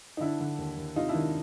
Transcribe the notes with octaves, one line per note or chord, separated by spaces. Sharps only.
D#4
D3 D4 E4
D3
D#2
D#2
C3 D#4 F4
D4 E4
D#3